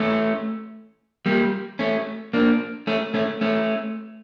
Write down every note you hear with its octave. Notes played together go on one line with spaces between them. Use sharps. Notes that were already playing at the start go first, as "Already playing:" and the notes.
Already playing: A3 C#4
G3 A#3
A3 C#4
A#3 D4
A3 C#4
A3 C#4
A3 C#4